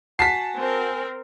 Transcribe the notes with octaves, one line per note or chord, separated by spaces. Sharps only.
F#4 G#5 A5 B6 C7
C4 A#4